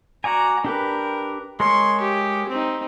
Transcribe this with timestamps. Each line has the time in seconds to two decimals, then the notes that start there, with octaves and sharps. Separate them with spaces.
0.24 F#4 D5 G#5 A#5
0.64 D4 G4 A#4 B4
1.60 G#3 A#4 C#5 C6 C#6
2.00 G4
2.48 C4 D#4